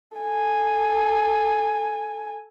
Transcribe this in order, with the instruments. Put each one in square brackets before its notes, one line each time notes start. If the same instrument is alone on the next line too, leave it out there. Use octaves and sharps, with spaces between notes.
[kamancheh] A4 G#5